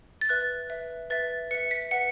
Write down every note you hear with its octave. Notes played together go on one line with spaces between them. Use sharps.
A6
B4 E5 F#6
B4 E5
B4 E5 A6
B4 E5 C#7
B6
B4 F#5 C#7